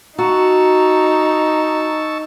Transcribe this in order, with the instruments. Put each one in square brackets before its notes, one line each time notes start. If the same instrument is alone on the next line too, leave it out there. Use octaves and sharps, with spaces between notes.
[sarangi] D#4 [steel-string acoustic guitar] F#4 [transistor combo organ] A5 C#6 E6 [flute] A#5